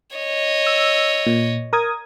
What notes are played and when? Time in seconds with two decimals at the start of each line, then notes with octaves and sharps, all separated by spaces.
0.16 C#5 D#5
0.67 E6
1.27 A#2
1.73 A#4 D#6 G#6